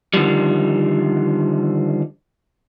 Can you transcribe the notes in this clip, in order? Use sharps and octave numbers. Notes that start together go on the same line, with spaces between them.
D3 D#3 F3 G3